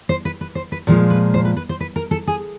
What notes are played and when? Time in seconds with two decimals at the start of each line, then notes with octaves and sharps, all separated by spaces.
0.09 C5
0.25 B4
0.41 B4
0.55 C5
0.72 B4
0.87 A#2 F3 G#3 A#4
1.10 B4
1.34 C5
1.45 B4
1.57 B4
1.69 C5
1.80 B4
1.96 A#4
2.11 A4
2.27 G#4